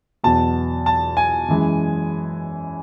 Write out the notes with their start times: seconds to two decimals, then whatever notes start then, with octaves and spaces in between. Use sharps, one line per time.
0.24 E2 B2 F#3 B3 A5
0.86 A5
1.17 G#5
1.48 F#2 E3 G#3